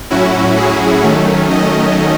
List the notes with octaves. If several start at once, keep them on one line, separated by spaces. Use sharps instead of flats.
A2 F#3 C#4 E4 F#4
G#4
D#3 F#3 A3 C#4
D#5